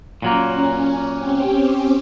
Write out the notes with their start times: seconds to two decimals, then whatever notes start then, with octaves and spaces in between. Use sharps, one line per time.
0.22 A#2 F#3 A#3 C#4
1.13 C4 C#4 G4